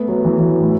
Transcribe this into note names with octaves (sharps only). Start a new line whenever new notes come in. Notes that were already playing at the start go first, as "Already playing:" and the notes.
Already playing: A3 B3
F#3
E3
F#3
A2